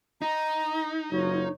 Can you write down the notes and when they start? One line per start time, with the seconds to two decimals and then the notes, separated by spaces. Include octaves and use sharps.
0.22 D#4 A#5
1.11 F#1 F#3 F4 C#5